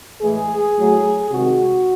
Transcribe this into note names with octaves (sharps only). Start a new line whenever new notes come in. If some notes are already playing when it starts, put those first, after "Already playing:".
A2 E3 G#3 G#4
A2 F#3 A3
C3 D#3 G#3 F#4